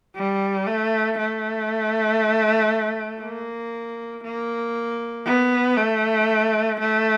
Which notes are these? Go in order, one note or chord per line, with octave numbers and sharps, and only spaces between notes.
G3
A3
A3
A#3
A#3
B3
A3
A3